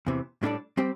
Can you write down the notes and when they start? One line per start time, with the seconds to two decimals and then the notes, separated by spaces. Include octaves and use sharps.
0.07 E2 C3 E3
0.43 A2 G3 D4 A4 D5
0.77 G3 C4 G4